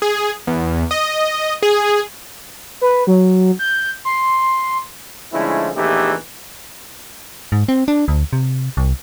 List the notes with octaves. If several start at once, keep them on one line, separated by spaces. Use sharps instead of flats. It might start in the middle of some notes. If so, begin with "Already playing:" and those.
G#4
E2
D#5
G#4
B4
F#3
G6
C6
D3 F3 G#3 A3 C#4 E4
A#1 E2 E3 A3 D#4 G4
G#2
C4
D4
D2
C3
C2